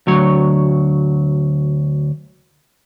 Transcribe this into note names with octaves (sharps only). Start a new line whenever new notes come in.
D2 F#3 C#5